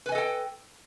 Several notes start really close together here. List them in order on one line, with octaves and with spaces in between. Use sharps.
B4 G#5 D#5 A4 G5